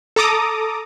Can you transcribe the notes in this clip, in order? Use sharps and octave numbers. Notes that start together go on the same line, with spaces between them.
A4 A#5 D6 D#6